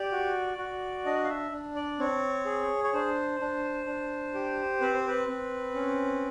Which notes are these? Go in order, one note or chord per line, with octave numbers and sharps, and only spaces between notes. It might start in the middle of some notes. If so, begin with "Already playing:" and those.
Already playing: G4 D5
F#4
F#4
D4 D#5
F5
E5
D4
D5
C4 C#5
G#4
C#5
D4 C5
D4
D4
G4
C4 B4
C5
B4
C4
C#4